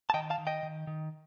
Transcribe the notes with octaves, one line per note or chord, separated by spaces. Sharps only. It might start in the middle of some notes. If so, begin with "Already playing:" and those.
A5
D#3 D#5 G5
F5 A5
D#3
D#5 G5
D#3
D#3